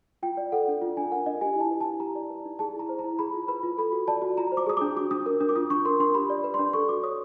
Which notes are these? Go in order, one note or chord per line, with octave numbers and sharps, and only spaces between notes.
F4 G5
D5
A4 F#5
D4
F4
D4 G#5
A#4 F#5
D4 D#5
G4 G#5
E4 A5
B4
A5
E4
G4 A#5
D5
B4
D#4
G#4 A5
E4
A#5
C5
A#5
E4
G#4 B5
F4
B4 B5
F4
A4 B5
F#4
D5 A5
F#4
F4 A#5
C5
D6
G#4 D#6
D4 D6
F#4 D6
D4 D#6
A#4
D4 D#6
D6
F4 D#6
D4 C#6
A#4 C6
D4 C6
G4 B5
D5
B4
D4 C6
A4 C#6
F#4 D6
C#5 D#6